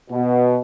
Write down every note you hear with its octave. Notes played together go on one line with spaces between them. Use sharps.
B2